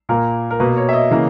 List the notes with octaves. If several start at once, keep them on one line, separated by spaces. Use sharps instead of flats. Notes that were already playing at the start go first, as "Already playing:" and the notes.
A#2 A#3 A#4
A#4
B2 A#3 B4
C#5
E5
D#5
C#3 E3 A#3